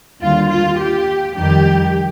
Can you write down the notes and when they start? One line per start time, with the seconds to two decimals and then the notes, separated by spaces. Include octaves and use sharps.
0.21 D#2 D3 G3 F4
0.49 F4
0.78 G4
1.36 F2 D#3 G3 G4